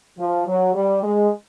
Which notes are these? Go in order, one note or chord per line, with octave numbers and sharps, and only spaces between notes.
F3
F#3
G3
G#3